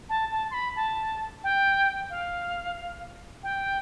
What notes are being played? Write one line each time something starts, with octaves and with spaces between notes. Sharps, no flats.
A5
A5
C6
B5
A5
G5
F5
G5